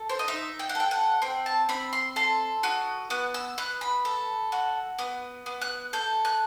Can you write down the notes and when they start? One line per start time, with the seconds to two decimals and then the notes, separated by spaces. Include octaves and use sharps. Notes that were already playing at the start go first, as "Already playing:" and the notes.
Already playing: A4
0.09 C5
0.19 D#5
0.28 D#4 E5
0.59 G5
0.69 F#5
0.75 A4 G5
0.91 F#5
1.22 C4 G5
1.46 A5
1.69 C4 B5
1.93 C6
2.16 A4 C6
2.63 F#4 D#6
3.10 B3 F#6
3.34 E6
3.58 B3 F#6
3.81 B5
4.05 A4
4.52 F#4
4.98 B3 D#6
5.46 B3
5.62 F#6
5.93 A4 G6
6.25 F#6